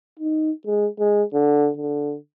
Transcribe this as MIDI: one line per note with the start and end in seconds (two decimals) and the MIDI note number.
0.20 0.51 63
0.66 0.87 56
0.99 1.23 56
1.34 1.70 50
1.77 2.15 50